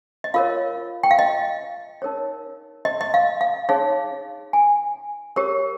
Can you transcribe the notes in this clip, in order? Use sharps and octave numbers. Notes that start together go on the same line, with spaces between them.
D#5
F4 A#4 C#5 F5
G5
F5
D#5
D#4 A#4 C#5
D#5
D#5
F5
F5
D#4 G#4 C#5 F5
G#5
G4 A#4 C#5